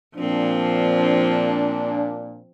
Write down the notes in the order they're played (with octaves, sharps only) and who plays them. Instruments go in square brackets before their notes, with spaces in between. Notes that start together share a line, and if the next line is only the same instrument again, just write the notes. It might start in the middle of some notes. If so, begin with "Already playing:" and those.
[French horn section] A#2 D4 [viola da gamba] F3 C4